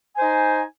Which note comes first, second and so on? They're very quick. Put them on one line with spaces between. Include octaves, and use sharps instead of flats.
G#5 C5 D#4